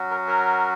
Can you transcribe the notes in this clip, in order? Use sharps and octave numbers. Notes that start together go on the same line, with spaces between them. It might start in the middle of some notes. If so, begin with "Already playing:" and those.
Already playing: F#3 C#4 F#4
A#4
A#4